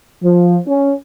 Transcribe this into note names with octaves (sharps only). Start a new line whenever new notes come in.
F3
C#4